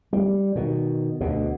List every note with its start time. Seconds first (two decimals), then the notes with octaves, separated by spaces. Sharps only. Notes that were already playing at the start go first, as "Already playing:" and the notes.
0.13 G3
0.55 B2 D#3
1.20 D2 B2